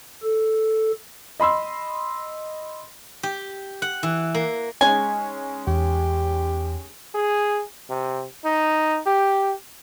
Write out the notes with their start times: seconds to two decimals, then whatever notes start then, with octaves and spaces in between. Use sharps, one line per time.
0.23 A4
1.40 D#5 B5 C6 E6
3.23 G4
3.82 F#5
4.03 E3
4.34 A#3
4.81 G#3 C#4 D#4 G#5
5.67 E2 G4
7.15 G#4
7.90 C3
8.45 D#4
9.06 G4